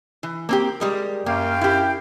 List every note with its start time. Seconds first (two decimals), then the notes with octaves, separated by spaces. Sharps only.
0.23 E3
0.49 A#3 C4 G4
0.80 G3 G#3 A#4
1.26 F#2 A#3 F5 G5
1.61 E4 G4